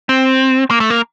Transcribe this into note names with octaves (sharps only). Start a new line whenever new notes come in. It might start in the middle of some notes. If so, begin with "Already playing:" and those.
C4
A#3
A3
A#3